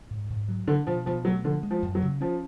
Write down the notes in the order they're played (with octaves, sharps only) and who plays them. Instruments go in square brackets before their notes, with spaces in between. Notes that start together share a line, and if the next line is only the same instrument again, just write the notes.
[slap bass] G#2
G#2
F#3
[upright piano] D3 [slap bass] D4
[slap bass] B2 [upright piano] F3
[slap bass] B2 [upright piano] F3
[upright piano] F#3 [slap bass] A3
[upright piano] D3 [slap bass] F3
[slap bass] G#3
[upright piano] F3
[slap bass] F#2
[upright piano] F#3
[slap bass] C#3
[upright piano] F3 [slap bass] C#4